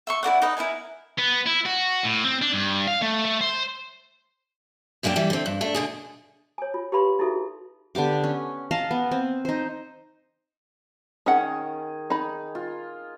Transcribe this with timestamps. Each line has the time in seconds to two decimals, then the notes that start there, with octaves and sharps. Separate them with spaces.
0.07 E5 C6 C#6
0.23 E4 A#4 D5 F#5
0.42 D#4 B4 D#5
0.57 E4 A#4 B4 G#5
1.19 B3
1.47 E4
1.66 F#4
2.04 A2
2.24 C4
2.42 D4
2.53 G2
2.88 F5
3.02 A3
3.25 A3
3.41 C5
5.03 F#2 G#3 A#3 D4 G5
5.16 E3 G3 G4
5.30 D3 C4
5.46 G2
5.61 A3 D4
5.75 B2 D3 G#4
6.58 C#5 G#5
6.74 F4
6.92 G4 B4 F5 B5 C6
7.19 D#4 E4 F#4 G#4 A4 E5
7.95 D3 B3 G4 D6
8.24 C#4
8.71 D#5 F5 A5 A#5
8.91 B3
9.11 C4
9.45 D#4 C5
11.26 D#3 C#4 G#4 F#5
12.10 D#4 B5
12.55 F4